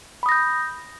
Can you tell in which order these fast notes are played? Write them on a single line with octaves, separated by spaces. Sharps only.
B5 D#6 A#6 G6